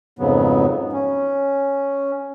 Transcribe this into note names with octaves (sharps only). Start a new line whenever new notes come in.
F2 G#2 C#3 F#3 B3
C#4